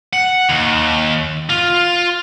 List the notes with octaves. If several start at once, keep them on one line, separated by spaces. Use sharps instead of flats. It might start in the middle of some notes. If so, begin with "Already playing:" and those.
F#5
D#2
F4